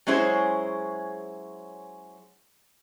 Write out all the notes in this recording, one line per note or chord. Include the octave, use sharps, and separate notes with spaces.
F#3 G#3 C#4 E4 G#4 C5